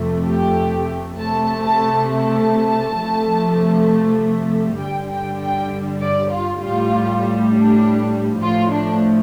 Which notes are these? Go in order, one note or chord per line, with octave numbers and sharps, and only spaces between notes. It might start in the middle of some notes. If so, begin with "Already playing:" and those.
Already playing: F2 C3 A3
G4
C3 A3 A5
A5
A5
C3 F3 A3
G2 D3 G3 G5
G5
G5
D5
F4
A2 G3 F4
D4
A2 F3 A3 F4
D4